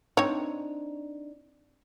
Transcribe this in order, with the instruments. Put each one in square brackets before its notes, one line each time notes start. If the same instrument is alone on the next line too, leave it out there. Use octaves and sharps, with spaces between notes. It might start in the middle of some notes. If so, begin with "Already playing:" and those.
[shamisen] C4 C#5 [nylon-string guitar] D4 D#4